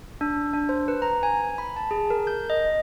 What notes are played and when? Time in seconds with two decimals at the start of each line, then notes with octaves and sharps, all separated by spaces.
0.21 D4
0.53 D4
0.69 C5
0.88 B4
1.02 A#5
1.23 G#5
1.58 B5
1.76 A5
1.91 G#4
2.10 A#4
2.27 G6
2.50 D#5